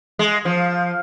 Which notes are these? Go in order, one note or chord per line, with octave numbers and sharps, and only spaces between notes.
G#3
F3